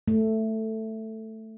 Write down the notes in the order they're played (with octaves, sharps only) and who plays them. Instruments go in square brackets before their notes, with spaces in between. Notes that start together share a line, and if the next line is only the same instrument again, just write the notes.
[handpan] A3